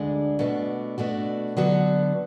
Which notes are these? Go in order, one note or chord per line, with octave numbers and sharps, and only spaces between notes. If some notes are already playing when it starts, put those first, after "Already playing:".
Already playing: D2 D3 G#3 D4
B2 A3 D4 F#4
B2 A3 D4 F#4
D3 F#3 B3 F#4 A4